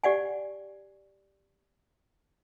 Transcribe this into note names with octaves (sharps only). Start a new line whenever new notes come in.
G4 D5 F#5 G#5